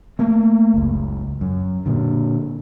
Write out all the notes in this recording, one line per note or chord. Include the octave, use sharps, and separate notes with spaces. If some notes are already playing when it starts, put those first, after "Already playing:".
A3 A#3
F#1 C#2
F#2
A#2 D3